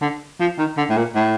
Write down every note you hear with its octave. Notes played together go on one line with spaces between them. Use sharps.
D3
F3
D#3
D3
A2
A#2
A2